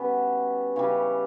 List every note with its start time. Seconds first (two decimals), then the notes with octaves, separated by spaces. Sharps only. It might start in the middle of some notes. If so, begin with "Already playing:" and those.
Already playing: B2 G3 B3 C#4 E4
0.76 C#3 E3 G3 C#4